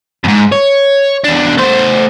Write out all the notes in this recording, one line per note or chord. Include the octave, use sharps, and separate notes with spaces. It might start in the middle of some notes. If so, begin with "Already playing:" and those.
F2 G#2
C#5
E2 D4
A3 C5